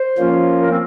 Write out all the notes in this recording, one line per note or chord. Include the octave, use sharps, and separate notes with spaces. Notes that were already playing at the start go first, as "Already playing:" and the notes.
Already playing: C5
F3 A#3 C#4 F4
A#4
C4